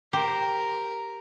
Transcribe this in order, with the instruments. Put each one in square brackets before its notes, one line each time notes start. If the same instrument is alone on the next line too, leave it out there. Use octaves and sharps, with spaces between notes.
[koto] G4 C5 [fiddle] A#4